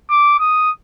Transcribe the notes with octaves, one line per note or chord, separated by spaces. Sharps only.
D6
D#6